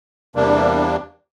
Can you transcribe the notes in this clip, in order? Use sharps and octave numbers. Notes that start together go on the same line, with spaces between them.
E2 C3 G3 A#3 D4